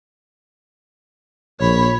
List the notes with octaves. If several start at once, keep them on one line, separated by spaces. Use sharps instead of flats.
A#1 C#5 B5